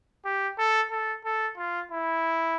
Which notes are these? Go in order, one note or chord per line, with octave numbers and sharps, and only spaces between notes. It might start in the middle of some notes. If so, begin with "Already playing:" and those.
G4
A4
A4
A4
F4
E4